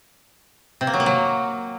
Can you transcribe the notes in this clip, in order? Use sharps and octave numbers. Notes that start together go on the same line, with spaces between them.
C3
A#3
F#3
A#3
F#3